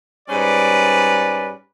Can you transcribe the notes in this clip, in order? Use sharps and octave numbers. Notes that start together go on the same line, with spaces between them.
G#2 G3 C#4 B4 D5